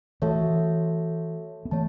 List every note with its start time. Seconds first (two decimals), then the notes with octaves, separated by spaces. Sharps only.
0.22 E3 A3 F#4 A4 C#5 E5 A5
1.65 B3
1.71 E3 A3 C#5 A5